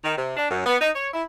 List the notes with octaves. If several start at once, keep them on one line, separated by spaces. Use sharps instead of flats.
D#3
C3
D4
F#2
B3
D#4
C#5
E4